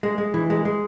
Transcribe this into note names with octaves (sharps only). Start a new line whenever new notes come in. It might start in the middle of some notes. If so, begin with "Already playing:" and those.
G#3
G#3
E3
G#3
G#3